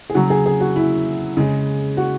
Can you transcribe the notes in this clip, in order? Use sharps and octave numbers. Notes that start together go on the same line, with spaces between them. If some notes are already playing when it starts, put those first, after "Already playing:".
G#4
C#3 F#3 F#4
G#4
G#4
F#4
E4
C#3 G#3
F#4